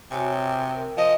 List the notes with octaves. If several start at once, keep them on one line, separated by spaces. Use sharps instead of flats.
C3 F#4 C#5 G#5
G5
A#4
F3 D#5